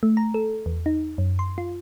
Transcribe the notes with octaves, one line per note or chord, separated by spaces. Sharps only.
A3
A#5
A4
E2
D#4
F#2
C6
F4